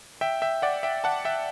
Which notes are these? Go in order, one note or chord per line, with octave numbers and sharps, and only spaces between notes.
E5 G5
E5 G5
D5 F#5
E5 G5
F#5 A5
E5 G5